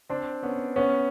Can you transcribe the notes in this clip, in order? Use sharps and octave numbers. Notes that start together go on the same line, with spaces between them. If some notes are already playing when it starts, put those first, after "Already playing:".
C4 D4
B3 C#4
B3 C#4